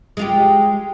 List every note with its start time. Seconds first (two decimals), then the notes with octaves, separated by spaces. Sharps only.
0.17 G#3 F4 G4